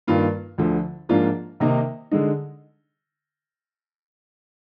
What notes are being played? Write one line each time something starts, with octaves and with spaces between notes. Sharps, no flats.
G2 D#3 A#3 F4
D2 D3 F3
G#2 F3 A#3 D4 F4
C3 D#3 A#3 D#4
D3 G#3 D#4